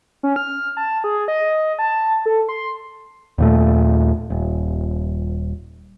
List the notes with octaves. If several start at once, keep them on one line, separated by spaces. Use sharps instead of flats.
C#4
F6
A5
G#4
D#5
A5
A4
C6
D#2 A#2 A3
D#1